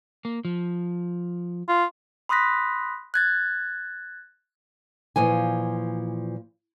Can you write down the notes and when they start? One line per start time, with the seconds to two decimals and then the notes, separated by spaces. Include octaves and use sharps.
0.25 A#3
0.45 F3
1.68 F4
2.29 B5 C6 D#6 F#6 A#6 B6
3.14 F#6 G#6 A6
5.16 A#2 E3 F3 G#5